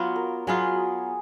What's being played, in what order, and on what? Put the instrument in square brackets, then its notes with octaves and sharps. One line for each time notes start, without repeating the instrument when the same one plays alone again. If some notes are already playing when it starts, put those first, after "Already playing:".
Already playing: [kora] F#3 B3 F4
[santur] A#4
[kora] F#3 B3 F4 [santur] G#4